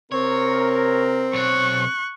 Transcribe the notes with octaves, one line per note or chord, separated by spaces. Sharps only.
C3 C4 A#4 C#5
B1 C#5 C#6 F#6